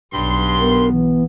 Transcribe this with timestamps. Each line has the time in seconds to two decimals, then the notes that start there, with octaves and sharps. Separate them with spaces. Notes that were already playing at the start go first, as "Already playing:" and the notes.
0.13 B1 G2 C6
0.59 B3 A#4
0.92 E3